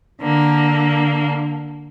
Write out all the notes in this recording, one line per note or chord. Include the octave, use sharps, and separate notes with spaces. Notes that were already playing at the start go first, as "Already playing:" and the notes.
D3 A#3